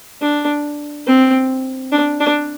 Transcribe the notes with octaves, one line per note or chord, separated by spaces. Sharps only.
D4
C4
D4
D4